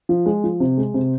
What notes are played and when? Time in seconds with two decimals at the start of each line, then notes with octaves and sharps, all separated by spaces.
0.09 F3
0.26 G#3
0.44 F3
0.60 C3
0.78 G#3
0.94 C3